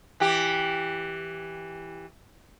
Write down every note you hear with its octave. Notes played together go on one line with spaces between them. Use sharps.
E3 G4